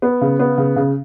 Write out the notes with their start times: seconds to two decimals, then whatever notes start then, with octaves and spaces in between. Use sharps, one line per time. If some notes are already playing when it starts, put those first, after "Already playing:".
0.02 B3
0.21 C#3
0.40 B3
0.58 C#3
0.76 C#3